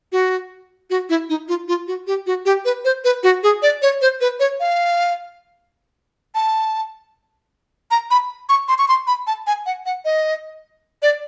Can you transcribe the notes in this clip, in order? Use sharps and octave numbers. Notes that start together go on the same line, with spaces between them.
F#4
F#4
E4
D#4
F4
F4
F#4
G4
F#4
G4
B4
C5
B4
F#4
G#4
D5
C#5
C5
B4
C#5
F5
A5
A#5
B5
C#6
C6
C#6
C6
B5
A5
G#5
F#5
F#5
D#5
D5